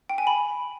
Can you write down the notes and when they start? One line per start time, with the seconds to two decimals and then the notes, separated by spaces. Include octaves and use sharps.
0.09 G5
0.18 G#5
0.27 B5